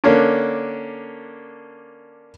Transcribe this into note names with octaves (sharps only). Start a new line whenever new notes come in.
D3 A#3 C#4 D4